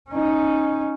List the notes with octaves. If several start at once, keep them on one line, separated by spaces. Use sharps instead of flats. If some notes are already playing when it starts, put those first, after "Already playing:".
C#4 D#4